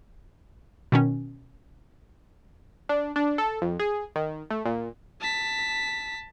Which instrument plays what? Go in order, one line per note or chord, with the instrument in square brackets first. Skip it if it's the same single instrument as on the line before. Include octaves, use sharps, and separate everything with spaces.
[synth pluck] B2 D#3 C#4
[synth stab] D4
D4
A4
F2
G#4
D#3
A3
A#2
[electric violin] A5 B6